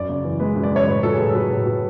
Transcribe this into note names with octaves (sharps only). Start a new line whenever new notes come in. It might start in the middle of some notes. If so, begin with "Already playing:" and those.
Already playing: F#2 D5
C#3
E3
G#3 B4
F#2
D5
C#3 C#5
A2 B4
F#3 A4
G#4
A2 A4
A4
F#3 B4
A2
F#3